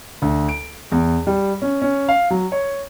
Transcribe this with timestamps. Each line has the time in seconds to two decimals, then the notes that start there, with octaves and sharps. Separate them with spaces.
0.22 D2
0.49 D7
0.92 E2
1.27 G3
1.62 C#4
1.82 C#4
2.08 F5
2.30 F#3
2.52 C#5